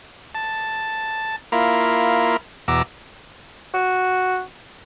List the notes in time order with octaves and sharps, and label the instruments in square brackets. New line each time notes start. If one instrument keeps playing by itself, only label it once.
[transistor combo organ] A5
A#3 E4 F4 A#4
E2 B2 A#5 D6 E6
[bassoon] F#4